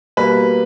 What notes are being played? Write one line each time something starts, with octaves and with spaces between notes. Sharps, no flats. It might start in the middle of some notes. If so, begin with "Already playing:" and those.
B2 G3 A#3 B4